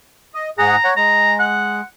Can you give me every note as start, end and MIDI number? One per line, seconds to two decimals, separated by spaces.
0.34 0.50 75
0.58 0.76 44
0.58 0.76 68
0.58 0.76 78
0.58 0.90 82
0.84 0.94 73
0.84 0.94 78
0.97 1.81 56
0.97 1.34 82
1.39 1.83 78